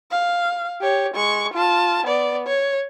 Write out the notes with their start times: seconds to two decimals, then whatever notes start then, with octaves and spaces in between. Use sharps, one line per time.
0.12 F5
0.81 G4 C#5
1.14 G#3 C#6
1.54 F4 A5
2.06 B3 D5
2.47 C#5